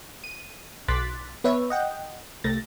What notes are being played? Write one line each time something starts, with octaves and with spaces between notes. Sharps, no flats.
D#7
B1 C6 D6 F#6 A6 B6
B3 B4 C#5 E5
D#5 F#5 G5
C2 A3 A6 A#6